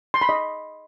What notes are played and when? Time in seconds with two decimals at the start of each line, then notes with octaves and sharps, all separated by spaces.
0.14 C6
0.21 B5
0.29 D#5